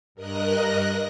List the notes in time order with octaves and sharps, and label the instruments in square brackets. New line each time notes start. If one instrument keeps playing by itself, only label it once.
[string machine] G2 A#4 D#5 F#6 A#6